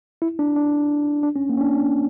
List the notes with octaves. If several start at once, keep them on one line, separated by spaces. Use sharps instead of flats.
E4
D4
D4
D4
C#4
A#3
C#4
D4
C#4
D4